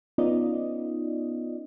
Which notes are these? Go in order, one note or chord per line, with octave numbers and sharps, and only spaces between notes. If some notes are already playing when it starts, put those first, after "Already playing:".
B3 C#4 D#4 F4 D5 D#5